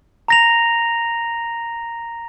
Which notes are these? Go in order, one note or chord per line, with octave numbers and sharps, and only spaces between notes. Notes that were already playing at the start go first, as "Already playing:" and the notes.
A#5 A#6 F7